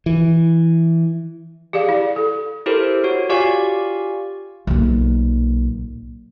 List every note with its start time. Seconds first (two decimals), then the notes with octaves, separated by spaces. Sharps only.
0.06 E3
1.73 G4 G#4 D5 F5
1.88 E4 D5
2.16 A4
2.66 E4 G4 A4 A#4 C5
3.04 F#4 C#5
3.29 F4 G4 D5 F5 G#5 C#6
4.67 B1 A#2